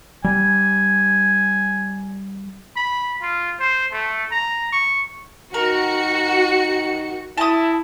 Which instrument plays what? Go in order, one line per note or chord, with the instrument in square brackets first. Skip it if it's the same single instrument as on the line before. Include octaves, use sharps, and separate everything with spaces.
[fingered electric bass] G3 [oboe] G#5
[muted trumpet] B5
F4
C5
A3
A#5
C#6
[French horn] D#3 [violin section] F#4 C#7 [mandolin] A#4
[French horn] E4 [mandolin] A5 D#6